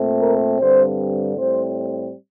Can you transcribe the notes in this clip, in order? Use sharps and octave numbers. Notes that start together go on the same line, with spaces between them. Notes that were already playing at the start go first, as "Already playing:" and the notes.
Already playing: A#2 A3 C4
A#4
G2 D3 G3 C4 C5
A2 G3 C4 C5